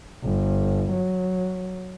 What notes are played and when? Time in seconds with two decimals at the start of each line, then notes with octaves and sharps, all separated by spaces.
0.24 G1
0.92 F#3